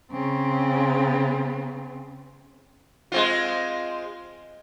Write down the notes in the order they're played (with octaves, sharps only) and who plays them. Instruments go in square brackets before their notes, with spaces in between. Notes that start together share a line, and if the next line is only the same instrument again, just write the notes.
[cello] C#3 C4
[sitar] G#3 C4 F4